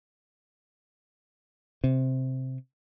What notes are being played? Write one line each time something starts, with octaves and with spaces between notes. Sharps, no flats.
C3